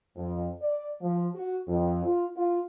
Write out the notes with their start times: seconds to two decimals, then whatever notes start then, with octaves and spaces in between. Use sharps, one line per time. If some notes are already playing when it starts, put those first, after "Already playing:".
0.16 F2
0.61 D5
1.01 F3
1.34 F#4
1.67 F2
2.05 F4
2.36 F4